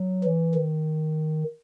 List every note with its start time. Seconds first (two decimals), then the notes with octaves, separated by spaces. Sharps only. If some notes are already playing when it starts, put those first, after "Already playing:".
Already playing: F#3
0.24 E3
0.55 D#3